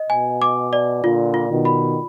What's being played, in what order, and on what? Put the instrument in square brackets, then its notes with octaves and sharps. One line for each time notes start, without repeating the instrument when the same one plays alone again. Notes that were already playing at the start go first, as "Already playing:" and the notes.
Already playing: [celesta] D#5
[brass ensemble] B2 [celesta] G#5
[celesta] D6
D5
[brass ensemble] A#2 D3 [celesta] F4
[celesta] F4
[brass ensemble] B2 D#3
[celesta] B5